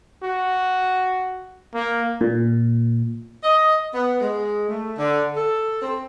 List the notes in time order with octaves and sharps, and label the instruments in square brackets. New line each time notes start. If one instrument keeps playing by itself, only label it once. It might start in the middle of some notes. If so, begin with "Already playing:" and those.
[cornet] F#4
A#3
[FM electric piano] A#2
[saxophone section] D#5
B3
G#3
A3
D3
A4
C4